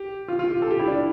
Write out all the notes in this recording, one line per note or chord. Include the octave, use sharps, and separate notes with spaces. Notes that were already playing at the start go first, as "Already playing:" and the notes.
Already playing: G4
F4
F4
G4
A4
G4
E4
D4